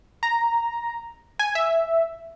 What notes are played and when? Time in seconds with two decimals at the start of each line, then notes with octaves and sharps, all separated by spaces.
0.23 A#5
1.39 G#5
1.55 E5